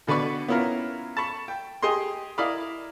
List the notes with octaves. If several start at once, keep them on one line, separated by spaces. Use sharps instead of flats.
B2 D3 B4 D5 C#6
B3 C#4 E4 F4 A#4
A5 B5 C#6
G5
G4 G#4 D#5 C6
E4 A#4 D5 D#5 F5 B5